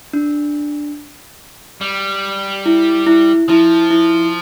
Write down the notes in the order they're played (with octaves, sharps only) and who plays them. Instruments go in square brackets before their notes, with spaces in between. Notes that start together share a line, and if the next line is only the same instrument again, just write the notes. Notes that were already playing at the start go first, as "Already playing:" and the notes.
[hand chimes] D4
[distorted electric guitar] G3
[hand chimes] E4
E4
[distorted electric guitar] F3 [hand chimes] E4
[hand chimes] E4